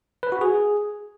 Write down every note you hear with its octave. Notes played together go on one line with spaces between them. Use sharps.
B4
F#4
G#4